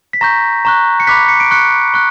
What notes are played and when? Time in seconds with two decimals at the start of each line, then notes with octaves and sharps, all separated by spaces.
0.13 B6
0.21 A#5 C#6 G6 A#6
0.65 A#5 C#6 F#6
1.00 C#7
1.07 B5 D6 F#6 B6
1.29 C#7
1.40 D7
1.51 C#6 F#6 C#7
1.94 C#6 F#6